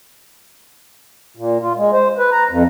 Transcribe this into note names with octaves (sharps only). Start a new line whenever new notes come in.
A#2
F4
G#3
C5
B4
A#5
F2